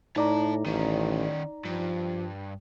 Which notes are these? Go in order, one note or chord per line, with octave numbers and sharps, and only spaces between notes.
A2 D#4 C#5 D5 A5 A#5
A1 D#3 C#4
G2 F3